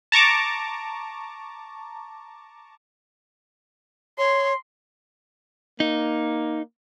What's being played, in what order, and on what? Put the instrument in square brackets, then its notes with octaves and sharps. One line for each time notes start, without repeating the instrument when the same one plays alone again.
[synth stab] A5 A#5 C#6 D6
[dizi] C#5 [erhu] C6
[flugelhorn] A#3 [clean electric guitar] D#4